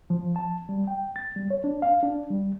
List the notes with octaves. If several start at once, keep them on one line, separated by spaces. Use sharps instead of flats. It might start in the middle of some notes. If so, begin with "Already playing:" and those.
F3
A5
G3
G5
A6
G3
C#5
D4
F5
D4
G3